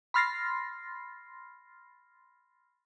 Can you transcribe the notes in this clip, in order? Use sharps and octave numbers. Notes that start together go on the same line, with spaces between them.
B5 C6 F6 A6 A#6 C7